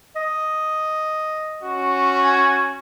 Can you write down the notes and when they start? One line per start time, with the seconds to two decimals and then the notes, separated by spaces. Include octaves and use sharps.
0.16 D#5
1.63 C#4 F#4
2.24 G#5